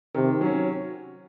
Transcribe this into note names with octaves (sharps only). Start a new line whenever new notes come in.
C3 D#3
F#3 C#4